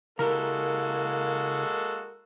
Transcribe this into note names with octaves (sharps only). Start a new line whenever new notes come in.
C#3 G#3 A#3 E4 F#4 G4 A4 A#4